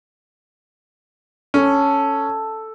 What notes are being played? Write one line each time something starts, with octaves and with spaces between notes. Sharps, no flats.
C#4 A4